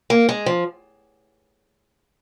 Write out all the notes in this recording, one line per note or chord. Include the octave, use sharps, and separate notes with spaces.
A#3
G#3
F3